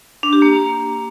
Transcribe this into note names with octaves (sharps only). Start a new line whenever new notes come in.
D4
G4
A#3